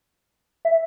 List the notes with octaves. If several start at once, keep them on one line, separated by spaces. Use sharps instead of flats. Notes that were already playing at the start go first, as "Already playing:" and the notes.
E5